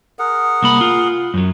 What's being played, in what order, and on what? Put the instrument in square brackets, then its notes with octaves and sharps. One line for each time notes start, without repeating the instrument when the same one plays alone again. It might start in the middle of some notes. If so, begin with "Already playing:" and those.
[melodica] G#4 A#4 F#5
[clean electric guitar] C2 A#3 B5
F4
F#2 F#3